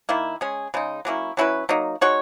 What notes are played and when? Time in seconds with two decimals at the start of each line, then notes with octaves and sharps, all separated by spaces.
0.09 D#3 A#3 E4
0.41 G#3 C#4 G#4
0.74 C#3 G#3 D#4
1.05 F#3 A#3 C#4 E4
1.37 F#3 C#4 E4 B4
1.69 F#3 A#3 D#4
2.01 G#3 D#4 F#4 C#5